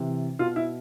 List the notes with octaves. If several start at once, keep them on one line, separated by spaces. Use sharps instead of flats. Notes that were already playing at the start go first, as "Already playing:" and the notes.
Already playing: C3 E3
B2 F4
E4